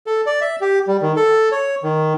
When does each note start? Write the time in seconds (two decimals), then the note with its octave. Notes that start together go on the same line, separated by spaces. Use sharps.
0.07 A4
0.26 D5
0.41 E5
0.61 G4
0.87 G3
1.01 D#3
1.16 A4
1.52 C#5
1.83 D#3